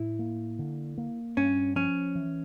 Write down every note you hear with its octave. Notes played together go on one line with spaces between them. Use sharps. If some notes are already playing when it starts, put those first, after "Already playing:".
Already playing: A2 E4
A#3
D3
A#3
G2 C#4
F3 C#4
E3